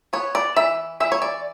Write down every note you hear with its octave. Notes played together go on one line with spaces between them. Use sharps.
B3 C#5
D5
E3 E5
E3 E5
C#5
D5